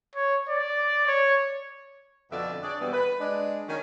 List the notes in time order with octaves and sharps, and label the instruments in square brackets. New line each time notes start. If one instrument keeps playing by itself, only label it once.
[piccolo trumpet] C#5
D5
C#5
[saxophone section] F2 B2 D3 D5 E5
D4 G#4 C#5 D5
B2 E3 G3 B3
B4
G#3 D4
D#3 F#3 C#4